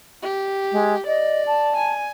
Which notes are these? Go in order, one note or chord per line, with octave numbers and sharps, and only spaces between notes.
G4
G#3
D5 D#5
A5
G#5